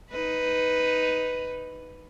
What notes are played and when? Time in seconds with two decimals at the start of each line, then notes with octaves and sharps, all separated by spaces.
0.11 D#4 B4